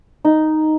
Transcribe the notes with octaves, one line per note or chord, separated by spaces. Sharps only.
D#4